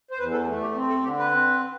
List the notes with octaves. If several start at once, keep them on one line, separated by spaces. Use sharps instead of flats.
C5
E2 B4
A4
A3
G4
C4
A4
D3 G4
B4
C4